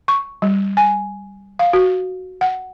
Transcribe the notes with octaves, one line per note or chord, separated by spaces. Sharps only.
C#6
G3
G#5
F5
F#4
F#5